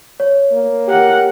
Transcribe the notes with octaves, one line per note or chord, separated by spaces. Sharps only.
C#5
A#3
G4 A#4 F#5